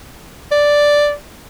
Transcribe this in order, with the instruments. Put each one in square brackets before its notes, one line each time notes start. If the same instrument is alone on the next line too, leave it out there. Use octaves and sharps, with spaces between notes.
[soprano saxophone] D5